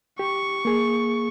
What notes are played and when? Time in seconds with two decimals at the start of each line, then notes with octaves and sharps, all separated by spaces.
0.19 G4 C#6
0.65 A#3 G#4